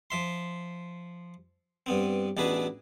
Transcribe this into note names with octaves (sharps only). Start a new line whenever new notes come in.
F3 E5 C6
G2 B3 C4
A1 B2 D4 E4 G#4 B4